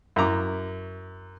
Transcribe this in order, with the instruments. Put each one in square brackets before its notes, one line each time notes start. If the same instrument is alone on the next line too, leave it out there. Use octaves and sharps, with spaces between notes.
[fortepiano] F#2 E4 A#5 D6